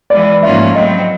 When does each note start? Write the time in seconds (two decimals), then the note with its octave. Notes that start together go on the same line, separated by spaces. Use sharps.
0.10 E3 G#3 B3 D5
0.42 G#2 F3 A#3 C#4 F4 E5
0.74 A2 F#3 A3 C4 D#5